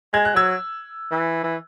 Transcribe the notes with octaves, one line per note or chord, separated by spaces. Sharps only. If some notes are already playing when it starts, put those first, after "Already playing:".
G#3 G#6
F#6
F#3 E6 G#6
E3
E3